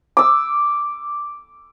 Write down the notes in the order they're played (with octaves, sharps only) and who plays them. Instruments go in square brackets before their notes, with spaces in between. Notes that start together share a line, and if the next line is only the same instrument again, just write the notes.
[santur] D6 E6